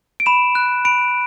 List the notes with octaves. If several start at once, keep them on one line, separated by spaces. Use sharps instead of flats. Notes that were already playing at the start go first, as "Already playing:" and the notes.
D7
B5 E7
F#6
B5 D7